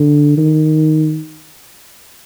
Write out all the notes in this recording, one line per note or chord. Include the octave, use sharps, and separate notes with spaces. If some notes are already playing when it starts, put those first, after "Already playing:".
Already playing: D3
D#3